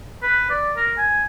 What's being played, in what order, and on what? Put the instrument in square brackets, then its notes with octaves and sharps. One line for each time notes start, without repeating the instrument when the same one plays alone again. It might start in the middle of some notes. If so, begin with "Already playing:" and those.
[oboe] B4
D5
A#4
G#5